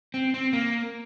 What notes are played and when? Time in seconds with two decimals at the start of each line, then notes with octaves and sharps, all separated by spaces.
0.14 C4
0.34 C4
0.53 A#3